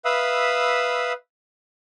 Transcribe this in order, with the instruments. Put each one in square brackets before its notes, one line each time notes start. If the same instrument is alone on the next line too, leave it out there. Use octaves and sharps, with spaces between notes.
[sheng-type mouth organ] B4 E5 F5 B5 D#6 E6